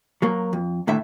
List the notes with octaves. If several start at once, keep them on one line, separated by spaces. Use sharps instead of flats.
F#3 A#3
F2
D#2 A2 D3 E5